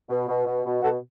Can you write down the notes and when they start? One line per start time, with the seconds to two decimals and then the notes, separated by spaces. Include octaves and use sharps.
0.10 B2
0.28 B2
0.46 B2
0.65 B2
0.82 B2 F#4 A4